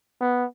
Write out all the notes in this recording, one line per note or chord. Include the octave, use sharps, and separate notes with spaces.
B3